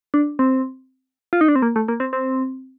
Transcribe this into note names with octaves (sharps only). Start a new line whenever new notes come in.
D4
C4
F4
D#4
D4
C4
A#3
A3
A#3
C4
C4